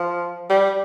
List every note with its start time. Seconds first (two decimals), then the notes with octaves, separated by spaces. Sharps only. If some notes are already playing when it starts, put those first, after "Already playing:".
Already playing: F3
0.50 G3